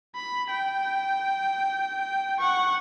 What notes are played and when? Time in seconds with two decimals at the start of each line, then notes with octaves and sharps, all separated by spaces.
0.15 B5
0.51 G5
2.39 F#5 C#6